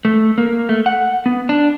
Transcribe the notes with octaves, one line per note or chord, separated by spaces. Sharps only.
A3
A#3
A3
F#5
B3
D4